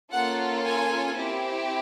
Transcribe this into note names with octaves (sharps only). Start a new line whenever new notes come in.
A#3 C#4 F4 A4 F#5
G#5
C4 E4 G4